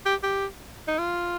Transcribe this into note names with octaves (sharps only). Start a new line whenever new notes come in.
G4
G4
D#4
F4